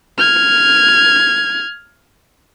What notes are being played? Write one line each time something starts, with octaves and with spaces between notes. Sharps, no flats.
F6 G#6